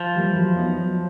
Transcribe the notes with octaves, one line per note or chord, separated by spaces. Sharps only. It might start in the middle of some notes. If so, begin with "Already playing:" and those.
Already playing: F3
E3 G3 A#3
F#3
B3 D#4 F#4
F#3